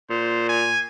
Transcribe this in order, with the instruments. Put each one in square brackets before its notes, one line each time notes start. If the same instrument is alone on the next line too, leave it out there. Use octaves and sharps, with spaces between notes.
[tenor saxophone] A#2 [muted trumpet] C5
[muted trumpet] G#5